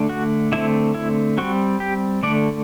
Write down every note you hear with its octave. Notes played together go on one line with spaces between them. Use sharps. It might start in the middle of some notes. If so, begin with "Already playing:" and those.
Already playing: D3 A3 D4
F#4
D3 A3 C4 E4
E4
G3 C4 F#4
G4
D3 A3 D4 D5